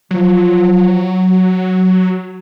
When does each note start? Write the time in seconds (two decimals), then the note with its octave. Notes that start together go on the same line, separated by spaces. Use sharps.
0.11 F3 F#3
1.30 F#4